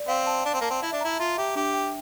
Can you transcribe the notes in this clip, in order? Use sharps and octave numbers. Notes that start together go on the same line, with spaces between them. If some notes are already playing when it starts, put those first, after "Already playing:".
Already playing: D5
C4 F5
A5
D4 A5
C4
A#3
A5
C4
E4 E5
D4
E4 A#5
F4 E5
G4 E5
D4 G4
G5